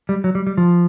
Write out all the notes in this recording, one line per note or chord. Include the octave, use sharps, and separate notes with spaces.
G3
F#3
G3
G3
F3